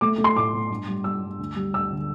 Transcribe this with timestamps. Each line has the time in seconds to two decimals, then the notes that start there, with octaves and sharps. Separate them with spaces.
0.01 A3 D6
0.18 A3
0.24 C6
0.36 A2 D6
0.54 A3
0.70 G2
0.88 G3
1.04 G3 E6
1.22 G2
1.39 D2
1.56 G3
1.74 D2 E6
1.92 D3